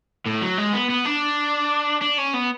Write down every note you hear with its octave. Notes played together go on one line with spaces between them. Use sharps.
A2
F#3
G#3
B3
B3
D4
D4
C#4
B3